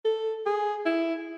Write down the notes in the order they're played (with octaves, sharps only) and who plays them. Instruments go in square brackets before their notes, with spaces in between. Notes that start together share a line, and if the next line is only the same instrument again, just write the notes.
[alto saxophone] A4
G#4
E4